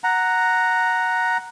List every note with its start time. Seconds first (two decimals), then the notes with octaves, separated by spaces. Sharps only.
0.04 F#5 A#5